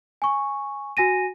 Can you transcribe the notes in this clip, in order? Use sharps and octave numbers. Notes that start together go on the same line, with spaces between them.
G#5 C#6
F#4 G#5 A#6 D#7